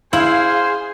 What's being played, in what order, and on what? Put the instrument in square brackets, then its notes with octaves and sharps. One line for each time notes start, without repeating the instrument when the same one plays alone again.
[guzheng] E4 [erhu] G#4 [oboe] C5 [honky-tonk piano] F5